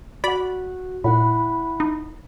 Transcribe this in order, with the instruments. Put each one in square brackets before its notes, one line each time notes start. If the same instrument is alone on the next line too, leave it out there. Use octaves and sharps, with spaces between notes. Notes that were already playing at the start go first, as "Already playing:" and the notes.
[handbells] F#4 F#5 [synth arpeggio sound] D5 B5
[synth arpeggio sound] A#2 [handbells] E4 F#5 B5
[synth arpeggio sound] D#4